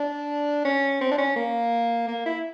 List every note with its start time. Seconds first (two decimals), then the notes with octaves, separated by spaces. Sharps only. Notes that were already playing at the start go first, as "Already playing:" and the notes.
Already playing: D4
0.65 C#4
1.01 C4
1.11 D4
1.18 C#4
1.36 A#3
2.08 A#3
2.26 E4